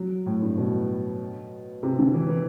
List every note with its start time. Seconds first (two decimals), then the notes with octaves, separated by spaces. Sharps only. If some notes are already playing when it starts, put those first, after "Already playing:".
Already playing: F#3
0.26 A2
0.42 G2
0.58 B2
1.83 C3
1.99 D3
2.14 E3
2.29 E3